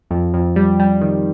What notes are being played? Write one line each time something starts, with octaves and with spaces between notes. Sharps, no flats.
F2
F2
G3
G3
D#3